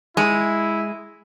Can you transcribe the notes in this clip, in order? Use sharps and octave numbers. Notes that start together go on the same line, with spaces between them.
G#3 E4